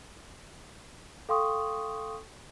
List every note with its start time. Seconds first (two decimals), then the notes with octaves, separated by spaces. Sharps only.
1.29 A4 F5 G5 C6 C#6 D#6